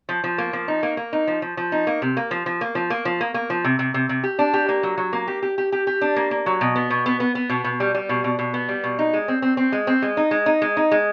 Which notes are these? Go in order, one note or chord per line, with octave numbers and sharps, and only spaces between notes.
F3
F3
A#3
F3
D#4
A#3
A#3
D#4
F3
F3
F3
D#4
A#3
C3
A#3
F3
F3
A#3
F3
A#3
F3
A#3
A#3
F3
C3
C3
C3
C3
G4
D4
G4
A#3
F#3
F#3
A#3
G4
G4
G4
G4
G4
D4
A#3
A#3
F#3
B2
B3
B2
B3
B3
B3
B2
B2
G3
G3
B2
B2
B2
B3
G3
B2
D#4
G#3
C4
C4
C4
G#3
C4
G#3
D#4
G#3
D#4
G#3
D#4
G#3